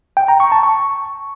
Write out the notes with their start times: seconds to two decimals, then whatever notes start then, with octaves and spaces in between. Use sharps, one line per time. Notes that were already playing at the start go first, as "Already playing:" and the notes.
0.17 G5
0.28 A#5
0.40 C#6
0.52 A5
0.63 C#6